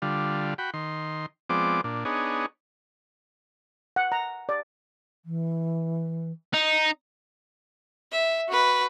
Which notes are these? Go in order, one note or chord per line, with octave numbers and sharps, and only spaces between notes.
D3 G3 F4
F#4 G5 B5
D#3 C6
F3 G#3 B3 C4 D5 D6
A#2 D4
B3 D4 D#4 G#4 C#5
F#5
A#5
D5
E3
D#4
E5
F#4 B4